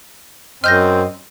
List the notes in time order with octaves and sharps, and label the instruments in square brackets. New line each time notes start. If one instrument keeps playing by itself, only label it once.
[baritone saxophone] F#2 [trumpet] C4 [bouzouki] C5 D#5 [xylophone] F6 G6 A#6